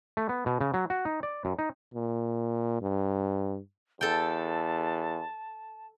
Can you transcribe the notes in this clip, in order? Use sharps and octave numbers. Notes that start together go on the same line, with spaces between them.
A3
B3
B2
C#3
F#3
F#4
D#4
D5
F#2
D#4
A#2
G2
E2 A4 G5 A5